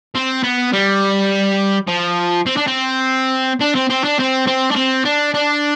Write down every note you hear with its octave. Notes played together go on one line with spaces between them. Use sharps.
C4
B3
G3
F3
C4
D4
C4
D4
C4
C4
D4
C4
C4
D4
C4
D4
D4